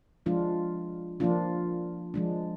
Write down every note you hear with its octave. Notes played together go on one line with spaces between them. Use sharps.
F3 G#3 D4 F4
F3 A#3 D4 F4
F3 G#3 D4